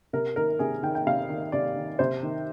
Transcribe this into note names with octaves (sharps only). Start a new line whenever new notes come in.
C3 A#4
D#3 A#4
C3 G#4
D#3 G5
G5
C3 F5
D#3
C3 D5
D#3
C3 C5
D#3